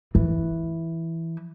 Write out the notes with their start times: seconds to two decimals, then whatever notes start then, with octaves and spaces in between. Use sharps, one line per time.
0.15 E3